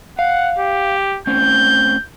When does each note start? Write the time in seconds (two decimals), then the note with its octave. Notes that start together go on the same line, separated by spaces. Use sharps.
0.19 F5 F#5
0.58 G4
1.27 A3 C4 C#4 G6